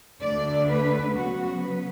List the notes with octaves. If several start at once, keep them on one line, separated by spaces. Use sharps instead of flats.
D2 D3 A3 D4 D5
B4
C#3 F#3 B3 F#4
B4